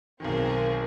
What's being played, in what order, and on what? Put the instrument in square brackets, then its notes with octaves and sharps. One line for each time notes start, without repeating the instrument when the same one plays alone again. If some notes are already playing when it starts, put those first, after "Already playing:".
[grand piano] B1 D#3 [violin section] C4 G#4 A#4